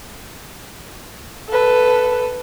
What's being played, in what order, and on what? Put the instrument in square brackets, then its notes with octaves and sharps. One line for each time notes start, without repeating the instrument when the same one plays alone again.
[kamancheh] A4 B4